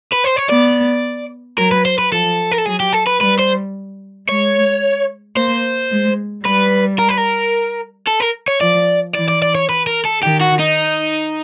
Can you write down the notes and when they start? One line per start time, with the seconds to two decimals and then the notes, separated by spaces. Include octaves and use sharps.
0.13 B4
0.25 C5
0.37 C#5
0.50 B3 D5
1.58 F#3 A#4
1.72 B4
1.85 C5
1.98 B4
2.12 F3 A4
2.52 A#4
2.58 A4
2.66 F#3 G#4
2.80 G4
2.93 A4
3.06 B4
3.20 G3 B4
3.39 C5
4.28 G#3 C#5
5.36 A#3 C5
5.91 G#3
6.44 G3 B4
6.99 A#4
7.09 B4
7.18 A#4
8.07 A4
8.20 A#4
8.48 C#5
8.61 F3 D5
9.15 E3 D5
9.28 D5
9.42 D5
9.55 C#5
9.69 B4
9.87 A#4
10.05 A4
10.22 D#3 G4
10.41 F#4
10.59 D#4